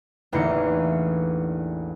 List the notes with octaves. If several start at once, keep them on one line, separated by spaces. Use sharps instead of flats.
A1 E2 D3 A#3 D#4 C#7